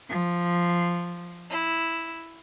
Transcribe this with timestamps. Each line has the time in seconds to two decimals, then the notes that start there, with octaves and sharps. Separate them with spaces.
0.11 F3
1.50 E4